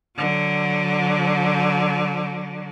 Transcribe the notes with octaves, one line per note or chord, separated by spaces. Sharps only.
D3 F#3